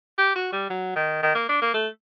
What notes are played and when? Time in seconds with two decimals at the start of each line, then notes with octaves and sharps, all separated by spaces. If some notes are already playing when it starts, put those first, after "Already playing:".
0.18 G4
0.36 F#4
0.52 G3
0.70 F#3
0.96 D#3
1.23 D#3
1.35 A#3
1.49 D4
1.62 A#3
1.74 A3